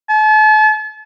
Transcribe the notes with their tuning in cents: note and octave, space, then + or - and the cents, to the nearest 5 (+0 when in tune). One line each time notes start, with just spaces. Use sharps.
A5 -40